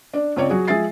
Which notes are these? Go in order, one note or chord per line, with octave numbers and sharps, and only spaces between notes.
D4 D5
C#2 C4 C#5 D5
F#3 F#4 G#4
F3 G#3 G#4 E5 A6 C7